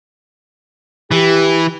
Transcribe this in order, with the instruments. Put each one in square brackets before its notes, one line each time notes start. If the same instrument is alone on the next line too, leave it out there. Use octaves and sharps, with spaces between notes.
[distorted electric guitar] E3 [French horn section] G4